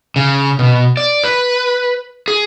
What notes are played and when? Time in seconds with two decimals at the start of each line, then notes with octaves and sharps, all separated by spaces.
0.16 C#3
0.59 B2
0.97 D5
1.24 B4
2.28 G#4